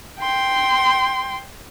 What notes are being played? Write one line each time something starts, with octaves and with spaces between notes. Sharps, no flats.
G5 C6